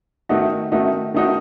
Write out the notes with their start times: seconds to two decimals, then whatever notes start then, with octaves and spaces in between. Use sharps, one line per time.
0.29 D#3 A3 D#4 F#4
0.72 D#3 A3 D#4 F#4
1.14 D#3 A3 D#4 F#4